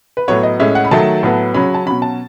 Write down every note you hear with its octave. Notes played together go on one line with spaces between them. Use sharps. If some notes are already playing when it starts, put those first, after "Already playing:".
B4
A2 F#3 B3 C#5
D#5
A2 G#3 C#4 E5
F#5
B5
D#3 F#3 A3 A5
A2 F#3 B3
C#3 F#3 C#4 B5
A5
B2 F#3 C#4 B5
A5